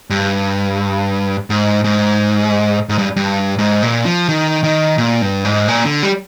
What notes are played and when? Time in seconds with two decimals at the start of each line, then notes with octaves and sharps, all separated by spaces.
0.10 G2
1.50 G#2
1.84 G#2
2.89 G#2
2.98 G2
3.16 G2
3.59 G#2
3.83 A#2
4.06 F3
4.29 D#3
4.64 D#3
4.98 A#2
5.22 G2
5.45 G#2
5.68 A#2
5.85 D3
6.03 G3